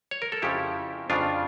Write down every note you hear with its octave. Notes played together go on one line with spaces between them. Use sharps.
C#5
A#4
A4
F2 C#3 F3 E4 G4
F2 C#3 F3 D4 F4